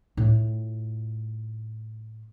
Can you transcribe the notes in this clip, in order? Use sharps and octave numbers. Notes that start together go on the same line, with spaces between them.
A2 F4